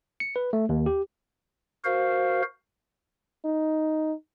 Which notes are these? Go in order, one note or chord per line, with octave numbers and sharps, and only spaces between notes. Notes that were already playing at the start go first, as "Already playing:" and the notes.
C#7
B4
A3
D#2
G4
F#4 A#4 C5 F5
D#4